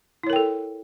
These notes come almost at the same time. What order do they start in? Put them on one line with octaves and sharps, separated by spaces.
E4 C#5 A#4 G5 A4